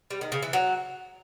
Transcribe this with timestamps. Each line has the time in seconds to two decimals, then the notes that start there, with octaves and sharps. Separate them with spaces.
0.11 G3
0.21 D#3
0.32 C#3
0.42 E3
0.53 F#3